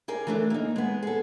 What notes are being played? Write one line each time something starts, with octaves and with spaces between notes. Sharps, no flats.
G4 G#4 A#4 D5
E3 A3 D4
A#3 D#4
G#3 B3
G#4 A4